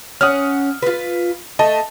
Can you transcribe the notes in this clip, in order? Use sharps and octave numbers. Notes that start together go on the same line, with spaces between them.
C#4 F#5 D#6 F6
F4 B4
A3 D#5 A5